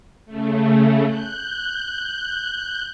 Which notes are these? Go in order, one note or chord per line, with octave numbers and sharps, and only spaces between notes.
C#3 A3
F#6 G6